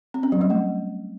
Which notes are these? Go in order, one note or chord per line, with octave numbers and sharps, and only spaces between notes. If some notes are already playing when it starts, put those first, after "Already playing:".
C4
C#4
F#3
G3
A3